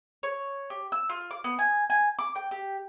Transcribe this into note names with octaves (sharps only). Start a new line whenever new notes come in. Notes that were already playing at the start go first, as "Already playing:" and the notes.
C#5
G4
E6
F4
D6
B3
G#5
G#5
D6
G5
G4